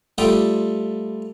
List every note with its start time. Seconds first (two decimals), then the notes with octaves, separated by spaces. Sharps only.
0.18 G3 A3 F4 A4 G5 D#6